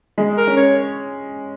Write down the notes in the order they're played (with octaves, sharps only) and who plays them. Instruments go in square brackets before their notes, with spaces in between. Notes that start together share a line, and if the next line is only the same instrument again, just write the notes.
[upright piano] G#3
[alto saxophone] A#4
[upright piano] C#4
[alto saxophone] C#5